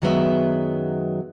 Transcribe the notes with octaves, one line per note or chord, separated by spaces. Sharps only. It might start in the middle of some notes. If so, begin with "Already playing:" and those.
F#2 D#3 F#3 G#3 B3 E5